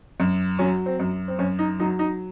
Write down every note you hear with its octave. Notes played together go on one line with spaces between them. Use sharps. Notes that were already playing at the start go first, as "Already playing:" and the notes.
F#2
F#3 C#4
C4
F#2
C4
F#2 C#4
D#4
F#3 D#4
D#4